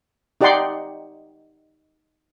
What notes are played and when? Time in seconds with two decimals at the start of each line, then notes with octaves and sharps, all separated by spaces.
0.41 D#4 G4 D5 F#5 G5 C6